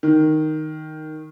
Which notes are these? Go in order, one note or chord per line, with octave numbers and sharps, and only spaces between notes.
D#3